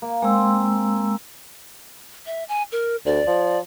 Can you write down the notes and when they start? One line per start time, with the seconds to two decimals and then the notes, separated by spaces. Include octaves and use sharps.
0.02 A#3
0.22 G#3 A#3 C4 E6
2.26 E5
2.49 G#5
2.72 A#4
3.06 D2 D5
3.27 F3